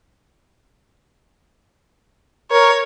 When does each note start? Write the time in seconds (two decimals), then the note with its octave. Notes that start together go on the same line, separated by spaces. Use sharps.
2.51 A#4 C#5